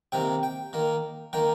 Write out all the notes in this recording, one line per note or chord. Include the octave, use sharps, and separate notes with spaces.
C3 D#3 A#3 G5
G5
D#3 A#3
D#3 A#3 G5